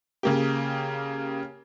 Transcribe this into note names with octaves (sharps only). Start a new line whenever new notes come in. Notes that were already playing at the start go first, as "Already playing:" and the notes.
C#3 A#3 G4